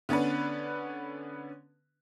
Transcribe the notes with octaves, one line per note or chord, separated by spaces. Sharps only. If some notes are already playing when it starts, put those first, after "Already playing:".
D3 B3 C#4 D4 B4